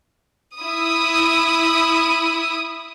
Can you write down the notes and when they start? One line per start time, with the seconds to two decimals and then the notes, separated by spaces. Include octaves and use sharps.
0.59 E4 D#6